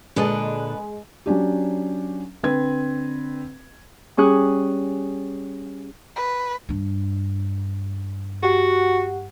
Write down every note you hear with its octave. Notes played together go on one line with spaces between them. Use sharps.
A#2 D3 G#3 D4 B4 D#5 A5
F#3 C#4 D4 G4
D3 C4 B4 G#6
G3 C#4 G#4 F#6
B4
G2 D4
F#4 G4 F#5